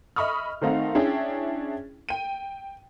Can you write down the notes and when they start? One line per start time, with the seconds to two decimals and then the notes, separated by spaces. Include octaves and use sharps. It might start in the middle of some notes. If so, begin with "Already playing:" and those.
0.16 D#5 E5 B5 C#6 D#6 F6
0.61 D#3 A3 C4 D#4 F5 F#5
0.95 C#4 D4 E4 G#4 G5
2.09 G5 D#7